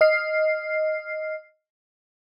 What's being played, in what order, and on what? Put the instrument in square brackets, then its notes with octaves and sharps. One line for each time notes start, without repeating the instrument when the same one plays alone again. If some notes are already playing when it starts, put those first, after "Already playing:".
[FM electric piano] D#5 F6 C7